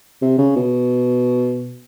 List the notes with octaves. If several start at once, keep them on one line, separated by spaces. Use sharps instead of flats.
C3
C#3
B2